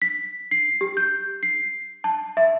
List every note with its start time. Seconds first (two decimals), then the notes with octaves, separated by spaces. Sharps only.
0.02 B6
0.51 C7
0.81 G4
0.97 G6
1.43 C7
2.04 A5
2.37 E5